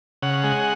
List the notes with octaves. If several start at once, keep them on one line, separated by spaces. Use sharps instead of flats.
C#3 F#5
G#3